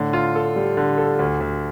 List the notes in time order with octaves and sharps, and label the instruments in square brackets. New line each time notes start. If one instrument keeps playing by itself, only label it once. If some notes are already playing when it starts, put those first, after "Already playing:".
Already playing: [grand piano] A2 D3
F4
A4
G3
D3
A4
D2
D2